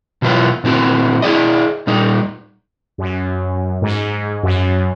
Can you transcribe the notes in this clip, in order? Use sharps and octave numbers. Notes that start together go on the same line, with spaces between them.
B2 E3 F#3 F4 B4
A#2 E3 C4 F#4
E4 G#4 D5 D#5
A#2 G3 D#4
F#2
G#2
F#2